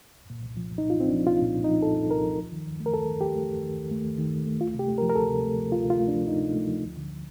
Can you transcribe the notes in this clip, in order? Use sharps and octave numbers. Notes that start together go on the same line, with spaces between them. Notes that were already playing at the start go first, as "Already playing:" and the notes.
C2
A#2
C2
F3
C2
D#4
A#2
F4
C2 C4
D4
F3
C2 F4
A#2
C2
D#4
F3
C2 A4
A#2
C2 A#4
F3
D#2
D#3
D#2
A3
A#4
D#2 A4
D#3
D#2 G4
A3
D#2
D#3
D#2
A3
D#2
D#3
D#2
A3
D2 F4
C3 G4
A3
A#4
F3
A#4
D2 A4
C3
A3
F3
D2 F4
C3 F4
A3
D4
F3
D2 D#4
C3
A3
F3
D2
D3